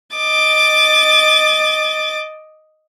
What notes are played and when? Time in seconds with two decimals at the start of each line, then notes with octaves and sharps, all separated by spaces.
0.15 D#5 D6 A6